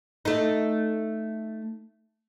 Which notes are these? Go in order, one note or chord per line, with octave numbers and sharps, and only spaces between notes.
A3 D#4